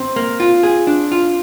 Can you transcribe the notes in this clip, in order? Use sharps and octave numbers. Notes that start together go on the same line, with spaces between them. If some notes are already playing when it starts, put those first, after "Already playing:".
Already playing: C4
A#3
F4
G#4
D4
F4